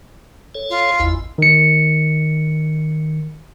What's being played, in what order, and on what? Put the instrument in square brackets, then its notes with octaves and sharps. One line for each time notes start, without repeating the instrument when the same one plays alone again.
[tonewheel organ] A4 C#5
[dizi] F4
[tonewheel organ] G#1 E2 E4
[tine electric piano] D#3 C#7